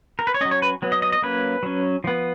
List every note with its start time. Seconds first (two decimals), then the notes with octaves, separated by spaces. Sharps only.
0.19 A#4
0.27 B4
0.34 C#5
0.41 C#4 D#5
0.45 F#3
0.51 C#5
0.62 B4
0.82 F#3 B3
0.92 D#5
1.02 D#5
1.12 D#5
1.22 F#3 A#3 C#4 B4
1.63 F#3 C#4
2.04 F3 B3